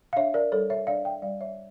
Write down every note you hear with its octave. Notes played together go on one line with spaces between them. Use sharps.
F5
D4 C#5 E5
A#4 D5
G3 A4 C#5
C#5 E5
D4 D5 F5
E5 G5
G3 D5 F5
C#5 E5